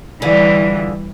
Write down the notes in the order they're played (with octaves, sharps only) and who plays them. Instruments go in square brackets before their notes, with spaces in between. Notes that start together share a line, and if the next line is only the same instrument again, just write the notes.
[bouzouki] D3 F4 G#4 [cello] E3 G3